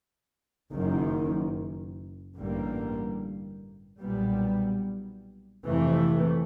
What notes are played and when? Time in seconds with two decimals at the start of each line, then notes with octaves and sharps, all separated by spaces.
0.71 F#1 F#2 D#3
2.36 A1 G2 D3 G3 A#3
4.01 B1 A#2 G3 B3
5.65 F2 C3 E3 A3